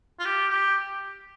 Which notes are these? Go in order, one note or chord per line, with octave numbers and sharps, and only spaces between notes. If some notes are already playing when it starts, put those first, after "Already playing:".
F4
G4
G4